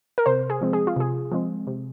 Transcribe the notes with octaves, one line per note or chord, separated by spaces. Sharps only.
A#4
C3 C5
G#4
F3 G#3 C4
G#4
F4
C3 G#4
F3 G#3 C4
C3